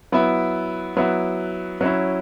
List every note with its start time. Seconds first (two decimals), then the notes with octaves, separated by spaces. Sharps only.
0.12 F#3 B3 E4
0.97 F#3 B3 E4
1.81 F#3 C#4 E4